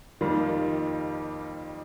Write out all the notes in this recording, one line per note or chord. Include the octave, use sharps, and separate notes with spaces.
F2 D#3 G3 A#3 F4